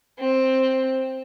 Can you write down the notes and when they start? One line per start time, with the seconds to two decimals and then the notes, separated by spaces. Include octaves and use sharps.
0.19 C4